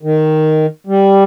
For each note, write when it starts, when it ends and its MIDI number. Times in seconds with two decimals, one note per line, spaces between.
0.03 0.66 51
0.87 1.24 55